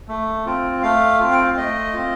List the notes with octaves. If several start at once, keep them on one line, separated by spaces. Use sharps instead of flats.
A3
C4 F4
A3 F5
C4 F4
G5
F5
A3 D#5
C4 F4